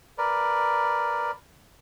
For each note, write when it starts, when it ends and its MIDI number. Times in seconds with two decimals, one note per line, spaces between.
0.18 1.31 70
0.18 1.31 71
0.18 1.31 74